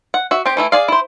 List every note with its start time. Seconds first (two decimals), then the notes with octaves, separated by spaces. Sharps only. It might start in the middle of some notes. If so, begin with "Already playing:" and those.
0.14 F#5
0.31 F#4 E5
0.46 C4 G4
0.57 E3 A3 E4
0.72 G#4 D5 F5
0.88 E4 C5